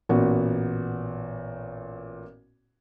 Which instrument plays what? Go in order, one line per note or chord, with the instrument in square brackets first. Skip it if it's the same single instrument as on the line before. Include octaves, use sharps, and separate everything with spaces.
[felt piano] A1 A#2 B3 F#4